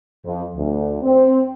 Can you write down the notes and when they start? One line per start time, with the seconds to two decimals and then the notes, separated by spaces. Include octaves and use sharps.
0.25 F2
0.56 D2
1.02 C4